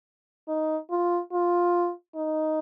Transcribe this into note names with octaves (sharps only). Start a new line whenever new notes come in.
D#4
F4
F4
D#4